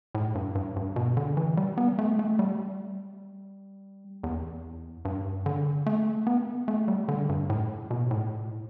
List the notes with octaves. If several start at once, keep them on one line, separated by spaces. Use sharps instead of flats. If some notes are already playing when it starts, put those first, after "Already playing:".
A2
G2
G2
G2
B2
D3
E3
G3
B3
A3
A3
G3
E2
G2
D3
A3
B3
A3
G3
D3
G2
A2
B2
A2